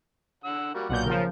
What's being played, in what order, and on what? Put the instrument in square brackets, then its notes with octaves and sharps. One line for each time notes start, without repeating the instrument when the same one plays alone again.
[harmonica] D3 F#5 E6
G3 A#3 F#4
[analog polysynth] B1 A#2 G6 [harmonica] F4 F#5
[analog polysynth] C#3 F3 [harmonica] A#4